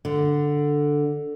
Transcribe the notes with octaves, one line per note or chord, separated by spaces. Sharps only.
D3